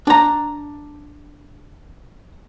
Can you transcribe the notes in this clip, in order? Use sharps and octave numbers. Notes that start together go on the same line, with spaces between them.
D4 A#5